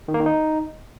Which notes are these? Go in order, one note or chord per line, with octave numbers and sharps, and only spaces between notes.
D#3
A#3
D#3
D#4